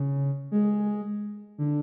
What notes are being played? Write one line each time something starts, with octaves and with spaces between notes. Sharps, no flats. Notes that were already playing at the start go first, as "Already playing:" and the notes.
Already playing: C#3
G#3
D3